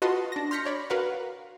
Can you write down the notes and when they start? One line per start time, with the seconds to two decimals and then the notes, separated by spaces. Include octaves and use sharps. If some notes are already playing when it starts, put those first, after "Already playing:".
0.02 F4 F#4 B4 D#5 A5 C6
0.32 D4 A#6
0.51 C6 F6 G6 A#6 B6 C#7
0.65 C#5 D5 B5
0.90 F#4 A#4 B4 F5 F#5